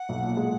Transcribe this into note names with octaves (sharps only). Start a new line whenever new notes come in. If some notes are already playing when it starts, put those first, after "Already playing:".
Already playing: F#5
B1
A#2
G#3